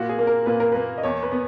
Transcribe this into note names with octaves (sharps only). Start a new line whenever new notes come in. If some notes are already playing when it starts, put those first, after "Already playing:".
Already playing: A#2 F#4
G#4
A#3
A#4
A#2 B4
A#4
A#3 B4
D#5
E2 C#5
B4
B3